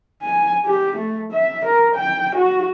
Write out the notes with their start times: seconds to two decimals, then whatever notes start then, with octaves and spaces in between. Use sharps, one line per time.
0.22 G#5
0.66 G4
0.96 A3
1.32 E5
1.65 A#4
1.95 G5
2.35 F#4